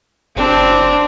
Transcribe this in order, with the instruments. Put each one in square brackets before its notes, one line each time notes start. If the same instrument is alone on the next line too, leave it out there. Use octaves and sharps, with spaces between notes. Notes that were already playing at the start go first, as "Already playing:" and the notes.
[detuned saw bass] F#1 [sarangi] C4 [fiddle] D4